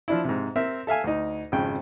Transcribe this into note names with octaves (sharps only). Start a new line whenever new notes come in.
F3 D4 E4
G#2 C3
C4 A#4 E5
A4 E5 F5 G#5
D2 D#4
G#1 F2 C#3 G5